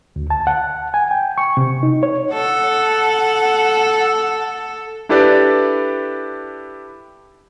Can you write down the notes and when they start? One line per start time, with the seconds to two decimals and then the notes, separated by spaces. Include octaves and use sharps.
0.16 D2
0.30 A5
0.47 F#5
0.94 G#5
1.11 G5
1.38 C#6
1.57 C3
1.83 D#4
2.03 C#5
2.34 A4 F#5
5.09 D4 E4 G4 A4 B4 D5